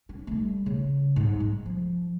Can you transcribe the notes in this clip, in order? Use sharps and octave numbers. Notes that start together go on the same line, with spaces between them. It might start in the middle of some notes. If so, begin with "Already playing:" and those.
C#4
G3 A3
C#3
G#2
G#3
F3